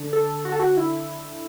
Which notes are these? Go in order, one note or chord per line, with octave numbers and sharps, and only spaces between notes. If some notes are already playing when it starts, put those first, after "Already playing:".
Already playing: D3 D4
A4
F#4
A4
F#4
E4